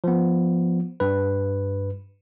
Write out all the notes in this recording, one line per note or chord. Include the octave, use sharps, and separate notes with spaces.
F3 B3
G2 B4